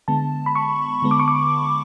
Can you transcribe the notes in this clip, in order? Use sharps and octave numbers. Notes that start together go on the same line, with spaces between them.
D3 G#3 B3 A5
B5
C#6
D3 G#3 B3
D6
C#6
D6